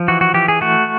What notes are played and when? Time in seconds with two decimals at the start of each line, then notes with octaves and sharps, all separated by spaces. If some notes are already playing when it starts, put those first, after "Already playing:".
Already playing: F3
0.08 E3 F#4
0.21 F#4
0.34 E3 G4
0.48 G#4
0.61 A3 F#4